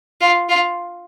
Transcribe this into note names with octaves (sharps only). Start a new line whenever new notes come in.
F4
F4